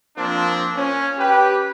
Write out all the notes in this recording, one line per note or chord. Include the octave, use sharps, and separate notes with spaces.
F3 A#3 C4 D4
C#4
G4 B4